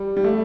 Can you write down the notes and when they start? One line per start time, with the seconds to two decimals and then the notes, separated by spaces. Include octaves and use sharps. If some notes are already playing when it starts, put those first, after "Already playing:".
Already playing: G3
0.17 G3
0.24 A3